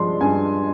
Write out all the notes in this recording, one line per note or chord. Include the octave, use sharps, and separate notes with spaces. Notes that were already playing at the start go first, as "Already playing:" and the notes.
Already playing: G2 F3 G#3 D4 C6
G2 G#5